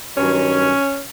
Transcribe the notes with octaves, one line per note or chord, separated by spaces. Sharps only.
G2 D#3 F#3 C#4